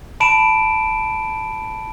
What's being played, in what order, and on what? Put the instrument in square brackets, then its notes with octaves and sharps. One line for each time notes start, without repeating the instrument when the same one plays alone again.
[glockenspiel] A5 B5 D7 E7